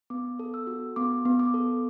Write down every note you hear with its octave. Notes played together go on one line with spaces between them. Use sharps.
B3 D6
A4
E6
F#4
B3 D6
B3
D6
A4